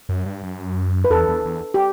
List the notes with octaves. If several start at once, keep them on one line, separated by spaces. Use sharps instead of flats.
F#2
G2
F#2
B4
E2 A4
E2
E2
G4